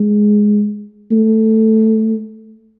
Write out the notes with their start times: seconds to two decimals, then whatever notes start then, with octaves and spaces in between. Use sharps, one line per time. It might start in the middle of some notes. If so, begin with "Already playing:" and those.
Already playing: G#3
1.12 A3